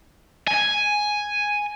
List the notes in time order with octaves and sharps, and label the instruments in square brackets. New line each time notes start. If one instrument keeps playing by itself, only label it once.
[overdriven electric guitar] G#5